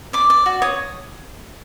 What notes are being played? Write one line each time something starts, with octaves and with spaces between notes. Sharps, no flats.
D5 D6
D5
F#4
C#5 D#6